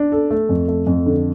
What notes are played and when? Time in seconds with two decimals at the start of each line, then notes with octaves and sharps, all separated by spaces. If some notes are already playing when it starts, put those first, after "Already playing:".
Already playing: D4
0.12 A4
0.31 A3
0.49 F2
0.68 A3
0.87 F2
1.06 D3